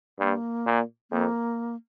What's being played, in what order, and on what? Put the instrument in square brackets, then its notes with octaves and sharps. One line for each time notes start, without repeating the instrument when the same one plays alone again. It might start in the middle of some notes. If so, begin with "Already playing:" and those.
[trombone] G2 [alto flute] A#3
[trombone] A#2
[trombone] F2 [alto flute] A#3